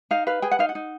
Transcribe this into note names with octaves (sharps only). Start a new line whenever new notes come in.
D#4 F5
B4 F5
G#4 G5
F#5
D#4 F5
F#5
D#4